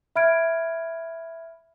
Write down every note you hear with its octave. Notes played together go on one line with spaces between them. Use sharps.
E5 B5 F6 G#6 D7